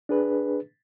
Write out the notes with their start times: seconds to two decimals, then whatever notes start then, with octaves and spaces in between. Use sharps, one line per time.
0.09 D4 G#4 B4